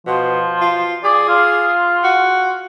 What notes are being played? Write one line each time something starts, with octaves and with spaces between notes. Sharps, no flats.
B2 F3
F4
G#4 D5
F4
F#4